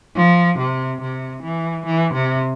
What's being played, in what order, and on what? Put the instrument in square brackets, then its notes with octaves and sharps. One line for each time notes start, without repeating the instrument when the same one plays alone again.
[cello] F3
C3
C3
E3
E3
C3